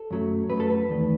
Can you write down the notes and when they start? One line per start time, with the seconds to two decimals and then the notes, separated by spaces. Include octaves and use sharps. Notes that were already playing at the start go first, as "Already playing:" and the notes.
Already playing: A4
0.11 F#2 F#3 A3
0.49 F#2 F#3 A3 B4
0.60 A4
0.70 B4
0.89 E2 D#3 A3